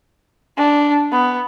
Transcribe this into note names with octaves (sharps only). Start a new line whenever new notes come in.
D4
B3